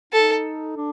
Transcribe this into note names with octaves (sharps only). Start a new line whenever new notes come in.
D#4 A4
D4